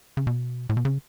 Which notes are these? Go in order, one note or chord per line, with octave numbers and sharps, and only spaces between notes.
C#3
B2
A2
B2
C#3